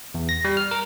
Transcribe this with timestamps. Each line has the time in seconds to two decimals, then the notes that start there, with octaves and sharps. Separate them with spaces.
0.14 E2
0.29 A#6
0.45 G3
0.57 F6
0.71 A#4